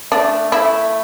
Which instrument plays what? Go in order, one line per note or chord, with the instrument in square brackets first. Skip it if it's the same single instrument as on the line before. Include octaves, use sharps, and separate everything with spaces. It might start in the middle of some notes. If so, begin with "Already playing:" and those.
[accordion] A3 [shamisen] D4
[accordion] A3 [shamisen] E4